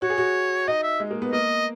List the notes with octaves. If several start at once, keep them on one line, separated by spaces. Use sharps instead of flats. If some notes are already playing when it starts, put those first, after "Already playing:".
F#4 C#5
G#4
F#4
D#4 D#5
E5
G#3
A#3
B3
A#3 D#5